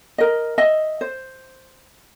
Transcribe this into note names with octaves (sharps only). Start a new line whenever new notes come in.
A#4 D#5
D#5 E5
C5